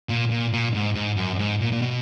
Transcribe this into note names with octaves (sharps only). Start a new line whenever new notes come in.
A#2
A#2
A#2
G#2
G#2
F#2
G#2
A#2
A#2
B2